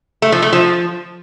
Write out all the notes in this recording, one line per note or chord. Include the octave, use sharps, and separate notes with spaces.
A3
F3
A3
F3